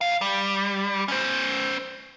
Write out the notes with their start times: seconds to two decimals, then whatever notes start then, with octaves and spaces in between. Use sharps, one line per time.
0.01 B1 F5
0.21 G3
1.08 C#4 C5